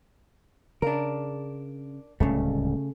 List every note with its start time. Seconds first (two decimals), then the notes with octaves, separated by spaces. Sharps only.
0.82 C#3 D4 A#4
2.20 D1 C#2 C#3 G3 A3